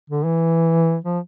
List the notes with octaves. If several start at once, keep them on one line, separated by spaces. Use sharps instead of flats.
D3
E3
F3